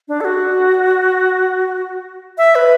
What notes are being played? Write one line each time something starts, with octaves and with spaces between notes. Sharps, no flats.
D4
A4
F#4
E5
B4